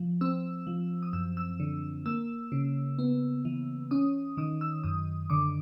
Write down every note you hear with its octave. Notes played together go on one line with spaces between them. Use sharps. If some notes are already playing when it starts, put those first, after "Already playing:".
Already playing: F3
C4 E6
F3
D#6
F#2 E6
E6
D3
A#3 E6
C#3
B3
E3
C#4 D#6
D#3 D#6
E6
F#2 D#6
D3 D6